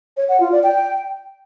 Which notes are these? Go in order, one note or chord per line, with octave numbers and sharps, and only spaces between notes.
C#5
F#5
F4
D5
G5